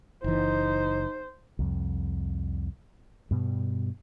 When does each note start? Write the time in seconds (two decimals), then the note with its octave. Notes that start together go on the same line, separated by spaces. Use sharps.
0.24 F#1 E3 D#4 C5
1.59 C2 F2
3.31 G2 B2 G3